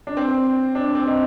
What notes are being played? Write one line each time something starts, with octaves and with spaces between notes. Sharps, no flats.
D4
C4
D4
C4
D#4